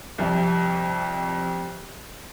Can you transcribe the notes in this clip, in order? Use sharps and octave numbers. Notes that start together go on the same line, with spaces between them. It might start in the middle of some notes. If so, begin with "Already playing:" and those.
C2 F2